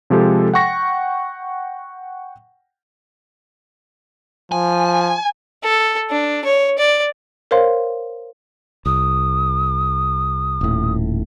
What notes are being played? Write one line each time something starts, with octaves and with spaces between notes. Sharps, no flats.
C3 F3 G#3 G4 A4
F#5 G5 C#6 A#6
F3 G#5
A4
D4
C#5
D5
A#4 C5 C#5 F5 C6
C2 D#6
D#1 A2